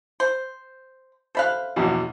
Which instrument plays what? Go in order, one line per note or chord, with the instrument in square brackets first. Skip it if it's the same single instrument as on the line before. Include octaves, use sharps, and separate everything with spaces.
[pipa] C5
[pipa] A4 E5 F5 [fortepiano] C5 B5 F#6
[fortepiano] A#1 E2 B2